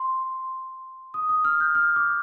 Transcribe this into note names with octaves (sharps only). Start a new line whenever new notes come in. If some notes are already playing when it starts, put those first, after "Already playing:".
Already playing: C6
D#6
D#6
F6
G6
F6
D6